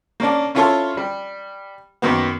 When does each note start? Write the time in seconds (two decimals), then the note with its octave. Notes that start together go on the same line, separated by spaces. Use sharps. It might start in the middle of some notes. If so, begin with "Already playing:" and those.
0.20 A#3 C#4 D4
0.55 C#4 E4 F4 A4 C#5 C6
0.97 G3
2.02 F#2 D#3 A#3 B3